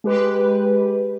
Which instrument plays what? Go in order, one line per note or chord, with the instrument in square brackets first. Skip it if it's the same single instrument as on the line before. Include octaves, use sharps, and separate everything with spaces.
[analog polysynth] G#3 G4 B4